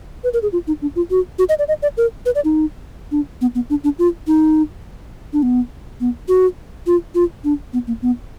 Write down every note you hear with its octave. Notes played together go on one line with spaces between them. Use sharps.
B4
A#4
G#4
F4
D#4
D4
F4
F#4
F#4
D#5
D5
D#5
D5
A#4
B4
D5
D#4
D4
B3
B3
D4
D4
F4
D#4
D4
B3
B3
F#4
F4
F4
D4
B3
A#3
B3